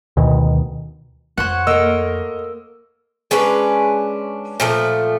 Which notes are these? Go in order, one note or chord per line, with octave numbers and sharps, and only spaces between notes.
D2 B2 D#3
F2 C5 C#5 F#5
A#3 A4 D#5 E6
G#3 C#4 D4 B4
A#2 F3 A3